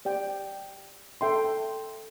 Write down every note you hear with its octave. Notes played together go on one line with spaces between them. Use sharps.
G4 D5 G5
A4 E5 G5 C6